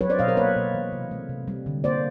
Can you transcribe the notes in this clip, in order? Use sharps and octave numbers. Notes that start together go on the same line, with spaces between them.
F#3 B4 C#5
C5 D5
B2 D#5 F5
A#4 C5
A#3 B4 C#5
B2
E3
C3
A3
C3
G3
D3
A#3 C5 D5